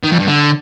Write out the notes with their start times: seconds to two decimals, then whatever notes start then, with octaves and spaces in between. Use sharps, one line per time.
0.03 D#3
0.11 F2
0.19 G2
0.26 D3